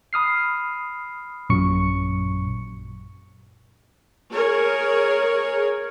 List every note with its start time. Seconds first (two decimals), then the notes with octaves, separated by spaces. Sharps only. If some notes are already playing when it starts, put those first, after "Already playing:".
0.13 B5 D#6 F6 C7
1.50 A1 F#2 A#2 F#3 C#6 C#7
4.33 G#4 A#4 C#5